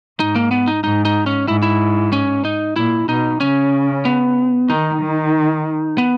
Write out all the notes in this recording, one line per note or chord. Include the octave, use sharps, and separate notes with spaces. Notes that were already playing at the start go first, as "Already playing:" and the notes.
G#2 D#4
A#3
B3
D#4
G#2 D#4
D#4
C#4
G#2 E4
E4
C#4
D#4
A#2 E4
B2 D#4
C#3 C#4
B3
D#3 D#4
D#3
B3